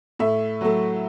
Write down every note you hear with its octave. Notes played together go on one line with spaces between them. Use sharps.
A2 E5
F#3 A3